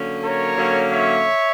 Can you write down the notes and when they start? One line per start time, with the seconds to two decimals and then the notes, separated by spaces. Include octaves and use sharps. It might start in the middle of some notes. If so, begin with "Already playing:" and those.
Already playing: D3 F#3 A#3 C#4
0.21 A#4 C#5
0.57 D3 F#3 A#3 C#4
0.91 C#5 E5